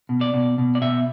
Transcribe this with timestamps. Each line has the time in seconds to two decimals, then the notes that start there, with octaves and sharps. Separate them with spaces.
0.09 B2
0.21 D5
0.34 B2
0.58 B2
0.75 D5
0.82 B2 E5